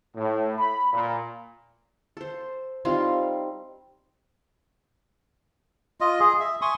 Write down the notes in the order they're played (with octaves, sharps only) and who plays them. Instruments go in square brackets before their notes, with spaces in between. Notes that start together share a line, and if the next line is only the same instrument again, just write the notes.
[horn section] A2
B5
A#2
[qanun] A4 C5
G3 C4 D#4 F4
[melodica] F4 D#5
G#4
E5
G#5 C6 C#6 D#6